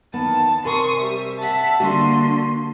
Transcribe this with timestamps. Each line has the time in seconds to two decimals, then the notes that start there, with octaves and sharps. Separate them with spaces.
0.13 E2 D#3 B3 A5
0.65 C3 A#4 G#5 C6 C#6 D#6
0.99 G3 E5
1.39 E5 F#5 A5
1.80 D3 G3 A#3 D4 F#4 C6